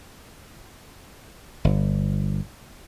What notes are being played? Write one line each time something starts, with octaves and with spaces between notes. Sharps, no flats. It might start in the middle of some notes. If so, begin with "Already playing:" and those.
G1